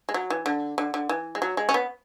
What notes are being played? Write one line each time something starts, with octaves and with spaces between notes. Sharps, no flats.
G#3
F#3
E3
D3
D3
D3
E3
G#3
F#3
G#3
C#4
B3